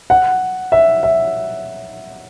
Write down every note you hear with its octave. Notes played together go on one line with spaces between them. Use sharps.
F#5
E5
E5